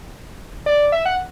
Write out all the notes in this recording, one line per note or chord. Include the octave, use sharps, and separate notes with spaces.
D5
E5
F#5